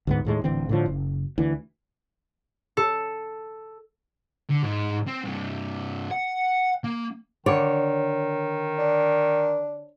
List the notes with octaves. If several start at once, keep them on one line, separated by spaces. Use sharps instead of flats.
D2 G#2 B3
D#2 A2 G#3
D1 D2 E3 C4
A2 D3 F3
F#1
D2 E3
A4
D3
G#2 D#4
C4
G2 C3
F#5
A#3
D3 D#3 C#5 D5
D4